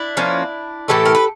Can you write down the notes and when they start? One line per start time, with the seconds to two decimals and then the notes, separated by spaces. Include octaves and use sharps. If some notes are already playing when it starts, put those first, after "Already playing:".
Already playing: D4 E4
0.17 F3 A#3 C#4
0.88 A2 E3 A3 G4 A4
1.05 A#4
1.15 B4